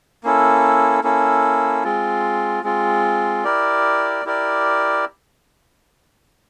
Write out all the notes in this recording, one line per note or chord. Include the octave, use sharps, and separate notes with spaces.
A#3 C#4 E4 A4
A#3 C#4 E4 A4
G#3 C4 F4
G#3 C4 F4
E4 G4 A#4 D5
E4 G4 A#4 D5